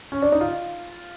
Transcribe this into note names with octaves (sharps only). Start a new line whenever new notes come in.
C#4
D4
D#4
F4